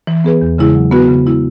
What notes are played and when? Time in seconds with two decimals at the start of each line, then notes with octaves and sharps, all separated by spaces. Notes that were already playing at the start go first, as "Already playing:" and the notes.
0.07 E3
0.24 B3 G#4 B4
0.41 E2
0.58 C#3 G#3 E4 G#4
0.75 F#3
0.91 B3 F#4 B4
1.08 C#3
1.25 G#3 E4